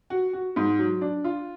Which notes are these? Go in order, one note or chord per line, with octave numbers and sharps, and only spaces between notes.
F#4
F#4
G#2
F#3
D4
F4